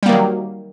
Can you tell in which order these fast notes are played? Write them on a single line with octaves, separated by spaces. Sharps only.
G3 A#3 D#3 F#3